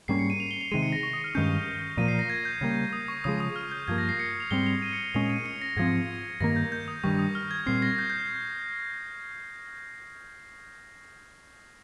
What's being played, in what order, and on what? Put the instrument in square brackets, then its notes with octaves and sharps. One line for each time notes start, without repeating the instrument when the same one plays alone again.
[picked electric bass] G#2 G3 A#3 C#4 [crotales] C7
[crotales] C#7
D#7
F7
G7
F7
[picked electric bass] C3 D#3 G#3 [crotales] D#7
[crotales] C#7
A#6
C#6
D#6
F6
[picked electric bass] G2 D#3 G#3 C#4 [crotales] G6
[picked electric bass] A#2 F3 A#3 [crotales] D#7
[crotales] C7
A#6
G#6
G6
[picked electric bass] C#3 G3 A#3
[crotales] D#6
C#6
[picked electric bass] C#3 F3 G#3 [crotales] D#6
[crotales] D#6
F6
G6
[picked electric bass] G2 F3 A#3 [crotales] G#6
[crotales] A#6
C7
C#7
F7
[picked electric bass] G#2 G3 C4 [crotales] G7
[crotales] F7
D#7
C#7
[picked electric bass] A#2 G#3 C#4 [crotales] F7
[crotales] D#7
C#7
A#6
[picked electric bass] G#2 F3 C4 [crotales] G#6
[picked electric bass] G2 D#3 A#3 [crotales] A#6
[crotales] G6
G6
D#6
[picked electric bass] G2 D#3 G3 [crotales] C#6
[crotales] D#6
F6
G#6
[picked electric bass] A#2 G3 C4 [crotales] C7
[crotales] A#6
G6
G6